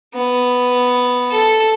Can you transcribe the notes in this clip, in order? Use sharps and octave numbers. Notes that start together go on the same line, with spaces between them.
B3
A4